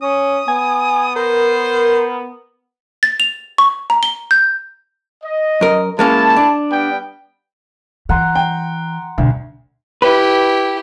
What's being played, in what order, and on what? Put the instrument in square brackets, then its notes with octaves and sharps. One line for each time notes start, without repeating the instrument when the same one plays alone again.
[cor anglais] C#4 [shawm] D#6
[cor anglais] B3 [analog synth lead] G#5
[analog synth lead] A#4 [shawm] C5
[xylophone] A6
F7
C#6
A#5
G7
G6
[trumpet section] D#5
[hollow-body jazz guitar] F#2 A#4
[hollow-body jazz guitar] G#3 A#3 C#4 [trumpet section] E4 A5
[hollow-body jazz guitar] D4
[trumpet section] G3 B3 G5
[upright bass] E3 [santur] F#5 A#5 C6
[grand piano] G5
[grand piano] D2 [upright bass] B2
[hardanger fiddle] E4 G4 [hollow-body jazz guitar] B4